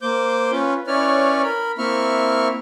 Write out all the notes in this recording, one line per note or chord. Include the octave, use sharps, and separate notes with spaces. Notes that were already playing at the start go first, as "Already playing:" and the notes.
A#3 C5 D6 G6
C#4 F4 B4
C#4 E4 B4 C#5 D5 F6
A#4 B5
A#3 C4 E4 E5 C#6 F6